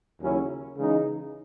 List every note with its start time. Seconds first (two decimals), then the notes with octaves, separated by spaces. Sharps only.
0.20 D#2 C#3 F#3 C#4 E4
0.77 C#3 E3 G#3 D#4